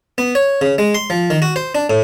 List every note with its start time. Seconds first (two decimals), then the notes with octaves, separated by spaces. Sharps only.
0.18 B3
0.35 C#5
0.61 C#3
0.78 G#3
0.95 C6
1.10 F3
1.30 D#3
1.42 F#4
1.56 C5
1.75 D4
1.90 A2